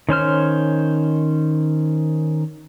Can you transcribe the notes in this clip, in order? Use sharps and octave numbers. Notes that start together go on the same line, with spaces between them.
D#3 C#4 C5 F6